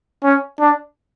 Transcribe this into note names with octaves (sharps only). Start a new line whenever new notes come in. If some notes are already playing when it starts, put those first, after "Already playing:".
C#4
D4